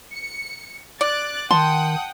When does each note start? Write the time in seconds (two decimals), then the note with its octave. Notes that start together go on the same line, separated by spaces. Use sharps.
0.13 C#7
1.01 D5 D6 F#6 A6
1.51 D#3 F#5 G5 A5 C6 D#6